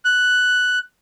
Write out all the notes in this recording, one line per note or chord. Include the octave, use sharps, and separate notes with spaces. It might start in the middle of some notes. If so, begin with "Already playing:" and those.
F#6